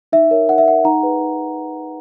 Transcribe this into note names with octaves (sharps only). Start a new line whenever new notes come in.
D#4 E5
A#4 C#5
D#4 F#5
E5
A#4 C#5 F#5
D#4 F#5 A#5
G#4 B4
D#4